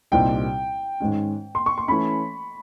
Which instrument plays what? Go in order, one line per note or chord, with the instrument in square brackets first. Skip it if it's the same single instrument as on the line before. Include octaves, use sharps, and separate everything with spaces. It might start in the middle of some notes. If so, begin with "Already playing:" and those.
[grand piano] C2 A#2 G3 C4 D#4 [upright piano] G5
[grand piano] G#2 D#3 G#3 C#4
[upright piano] C6
C#6
C6
[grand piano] E3 A3 C#4 [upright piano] B5